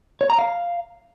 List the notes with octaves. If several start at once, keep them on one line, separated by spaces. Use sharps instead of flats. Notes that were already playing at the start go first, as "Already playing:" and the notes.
C#5
A#5
F5